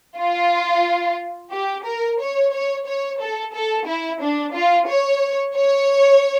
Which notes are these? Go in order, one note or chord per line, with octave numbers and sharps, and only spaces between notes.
F4
G4
A#4
C#5
C#5
C#5
A4
A4
E4
D4
F4
C#5
C#5